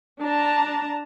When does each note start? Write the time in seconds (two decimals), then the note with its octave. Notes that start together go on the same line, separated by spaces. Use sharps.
0.21 D4 A5 A#5